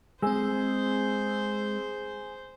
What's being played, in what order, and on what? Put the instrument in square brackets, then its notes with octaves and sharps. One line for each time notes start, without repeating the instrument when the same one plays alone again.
[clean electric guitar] G#3 [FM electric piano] C4 E6 [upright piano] G#4 [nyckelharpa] C5